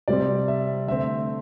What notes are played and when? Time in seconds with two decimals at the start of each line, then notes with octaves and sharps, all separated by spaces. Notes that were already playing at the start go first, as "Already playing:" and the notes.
0.08 C3 G3 C4 D5
0.48 E5
0.88 D3 A3 C4 E5